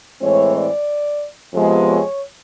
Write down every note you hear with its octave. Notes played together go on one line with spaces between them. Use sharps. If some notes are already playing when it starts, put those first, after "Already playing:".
A2 E3 G#3 C4 C#5
D5
F2 C3 F3 G#3 B3
C#5